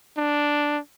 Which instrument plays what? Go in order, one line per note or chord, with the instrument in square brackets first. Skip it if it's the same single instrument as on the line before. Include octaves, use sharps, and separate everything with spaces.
[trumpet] D4